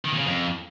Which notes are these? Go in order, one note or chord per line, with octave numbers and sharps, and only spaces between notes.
D#3
A#2
C#3
F2